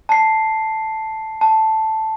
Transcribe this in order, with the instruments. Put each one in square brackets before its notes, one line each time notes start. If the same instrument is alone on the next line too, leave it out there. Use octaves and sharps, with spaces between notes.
[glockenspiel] A5 C7
A5